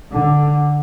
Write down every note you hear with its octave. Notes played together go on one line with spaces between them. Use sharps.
D3